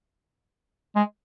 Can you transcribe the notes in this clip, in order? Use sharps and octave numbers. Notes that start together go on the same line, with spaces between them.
G#3